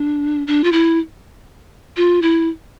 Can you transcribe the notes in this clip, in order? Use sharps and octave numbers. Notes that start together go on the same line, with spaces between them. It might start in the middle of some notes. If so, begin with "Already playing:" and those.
Already playing: D4
D4
F4
E4
F4
E4